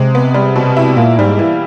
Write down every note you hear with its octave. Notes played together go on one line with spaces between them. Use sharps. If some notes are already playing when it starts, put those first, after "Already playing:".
Already playing: C3 G#3
B3
G3
B2
E4
A#2 A#3
G#2 G3
E3